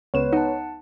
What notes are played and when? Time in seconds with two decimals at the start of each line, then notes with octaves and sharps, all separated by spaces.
0.14 C#2 B3 B4 C#5 E7
0.33 D#4 F#5 A5